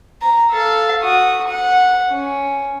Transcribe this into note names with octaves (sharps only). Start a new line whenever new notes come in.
A#5
A4 F5
F#4 D#6
F#5
C#4